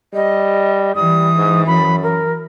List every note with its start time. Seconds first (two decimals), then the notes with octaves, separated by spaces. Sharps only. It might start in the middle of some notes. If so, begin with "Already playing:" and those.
0.14 G3 D#5
0.95 E3 G3 D#6
1.37 G#2
1.66 F#2 B5
2.03 A#4